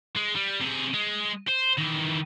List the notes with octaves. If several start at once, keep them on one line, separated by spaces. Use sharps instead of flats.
G#3
G3
C3 G#4
G#3
C5
D#3 E3